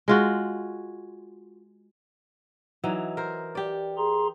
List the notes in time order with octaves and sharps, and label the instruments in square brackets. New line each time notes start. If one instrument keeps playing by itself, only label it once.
[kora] G#3 F4 F#4
E3 F#3 D#4
A#4 C5
G4 D5
[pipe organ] G#4 A#5 C6